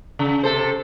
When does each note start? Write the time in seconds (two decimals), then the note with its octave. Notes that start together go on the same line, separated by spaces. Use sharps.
0.19 C#3
0.43 C3 A4 C5